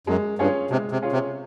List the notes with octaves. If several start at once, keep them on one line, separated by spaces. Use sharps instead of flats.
F#2 G#3
G2 C#4 F4 G#4 C#5
C3 G#3
C3
C#4 F4 G#4 C#5
C3